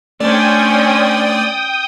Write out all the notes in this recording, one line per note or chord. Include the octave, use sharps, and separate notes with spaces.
A3 C#4 D4 C5 D5 G5 G#5 D#6